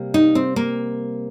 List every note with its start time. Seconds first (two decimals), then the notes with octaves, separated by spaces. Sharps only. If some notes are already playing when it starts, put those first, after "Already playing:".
Already playing: C3 G3 A#3
0.14 D#4
0.35 C4
0.56 A#3